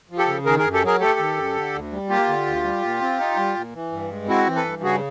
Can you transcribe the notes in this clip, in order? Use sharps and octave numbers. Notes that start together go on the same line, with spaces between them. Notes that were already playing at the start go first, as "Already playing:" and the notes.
F3
G4 A4
C#3
D#3 G#4 A#4
G#4 A#4
F#2
G4 A4
F#3 G#4 A#4
A3 G4 A4
D#3
F#2
D3
D2
G3
A#3 F4 G4
D3
D2
G3
A#2
C4
D#4
G3
A#2
E3
G2
G#3
C4 E4 F#4
E3
A4 B4
G2
C#3 F#4 G#4